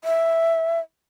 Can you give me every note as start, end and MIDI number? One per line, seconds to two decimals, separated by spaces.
0.04 0.80 76